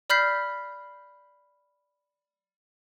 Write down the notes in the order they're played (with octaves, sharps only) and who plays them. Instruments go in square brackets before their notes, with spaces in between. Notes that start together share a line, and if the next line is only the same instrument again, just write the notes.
[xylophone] D5 B5 F6 G6 B6 C7